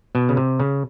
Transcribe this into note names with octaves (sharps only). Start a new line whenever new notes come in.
B2
C#3
C3
C#3